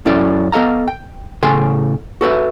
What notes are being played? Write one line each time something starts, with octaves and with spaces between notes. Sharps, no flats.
F#2 C#4 E4 A4 D5
B3 A4 D#5 F5 A#5
G5
A2 C#3 A4 G5 G#5 C6
F#4 A4 B4 E5